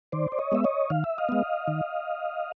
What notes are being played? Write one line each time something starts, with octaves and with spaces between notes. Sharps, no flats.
D#3 C5 D5
D5
C#5 D#5
G#3 B3 E5
C#5 D#5
D#3 F5
E5
D#5 F5
G#3 B3
D#3